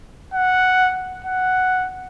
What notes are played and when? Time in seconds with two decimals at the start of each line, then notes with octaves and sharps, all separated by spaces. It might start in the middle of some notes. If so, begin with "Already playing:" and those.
0.34 F#5
1.25 F#5